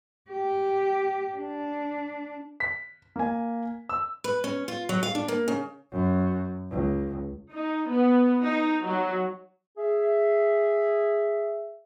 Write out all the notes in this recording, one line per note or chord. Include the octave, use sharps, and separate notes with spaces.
G4
D4
B6
A#3 G#5
E6
B4
C#4
F4
F#3
F5
D4
A#3
C#3
F#2
C#2
D#4
B3
D#4
F#3
G#4 E5